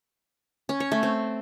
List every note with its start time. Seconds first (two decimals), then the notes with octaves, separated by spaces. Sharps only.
0.69 C#4
0.80 C#5
0.92 A3
1.03 C4